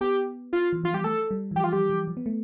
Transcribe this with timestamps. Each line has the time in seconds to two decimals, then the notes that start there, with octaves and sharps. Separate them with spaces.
0.01 B3 G4
0.53 F4
0.73 E3
0.84 F3 F4
0.94 G3 G4
1.04 A3 A4
1.31 G3
1.51 E3
1.56 F3 G4
1.64 F4
1.72 G3 G4
1.90 E3
2.08 F3
2.17 B3
2.26 A3